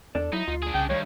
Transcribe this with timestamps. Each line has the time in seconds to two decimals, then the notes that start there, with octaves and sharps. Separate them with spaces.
0.15 E2 D4 A4 D5
0.33 F#3 D#4 E4
0.48 D2 F4
0.63 D4 G#4
0.74 C2 C#3 G5
0.90 G2 D#3 G3 C#5